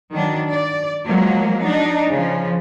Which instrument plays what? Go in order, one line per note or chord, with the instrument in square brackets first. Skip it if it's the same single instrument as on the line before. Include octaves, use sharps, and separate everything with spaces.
[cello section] D#3 F#3 D4
D5
F3 F#3 G#3 A#3
D4 D#4
C#3 F3